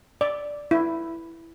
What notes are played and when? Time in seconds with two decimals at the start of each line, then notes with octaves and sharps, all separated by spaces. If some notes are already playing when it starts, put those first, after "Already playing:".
0.21 D5
0.71 E4